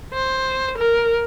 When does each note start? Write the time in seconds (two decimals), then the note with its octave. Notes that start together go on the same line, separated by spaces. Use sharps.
0.14 C5
0.78 A#4